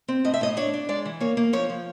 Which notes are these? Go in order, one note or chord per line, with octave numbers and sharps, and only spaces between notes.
C4
A2 D#5
E5
A2 D#5
D4 C#5
D4
G#3 D5
E3
A#3 C#5
A#3
F3 C#5
F3